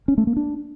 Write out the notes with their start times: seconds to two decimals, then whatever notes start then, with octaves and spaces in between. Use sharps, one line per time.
0.08 C#4
0.18 A3
0.27 A#3
0.36 D4